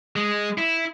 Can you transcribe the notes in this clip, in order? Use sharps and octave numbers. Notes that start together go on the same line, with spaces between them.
G#3
E4